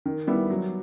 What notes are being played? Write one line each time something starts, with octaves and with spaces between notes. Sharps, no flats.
D#3
G3 B3 E4
F#3